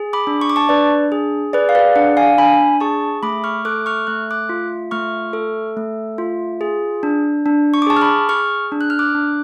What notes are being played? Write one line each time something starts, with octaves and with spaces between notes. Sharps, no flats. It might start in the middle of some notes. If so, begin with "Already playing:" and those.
Already playing: G#4
B5 D6
D4
C#6
D6
A5 C#6
D4 B4 D5
G#4
G#4 B4 D5
F5
B4 D5
D4 D5 F#5
F5 G#5
D4 G#5 B5
G#4 A5 C#6
A3 B5 D6
C#6 F6
A4 D6 F#6
C#6 F6
A3 F#6
D6 F#6
F4
A3 C#6 F6
A4
A3
F4
G#4
D4
D4
C#6
D6
G#4 A5 C#6
F6
B5 D6
G#4 C#6 F6
D4
F#6
F6
D6 F#6
D4